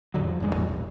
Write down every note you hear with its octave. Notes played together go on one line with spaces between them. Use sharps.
F2 A2 D3 F#3
F3
F1 G2 C3 G#3
E2 G2 A#2 F3
E1 A#1